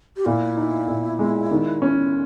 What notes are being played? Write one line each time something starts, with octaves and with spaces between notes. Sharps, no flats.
G4
A#2 E4
D#4
A#2
G#3
D#3
C#4